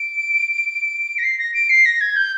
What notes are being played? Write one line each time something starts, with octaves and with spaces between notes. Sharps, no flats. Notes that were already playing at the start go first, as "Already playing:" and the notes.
Already playing: D7
A#6
C7
A#6
D7
C7
A#6
G#6
G6